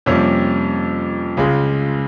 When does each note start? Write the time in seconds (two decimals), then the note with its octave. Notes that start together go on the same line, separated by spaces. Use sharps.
0.06 F2 C3 G3 A#3 C#4
1.37 C#2 C#3 G#3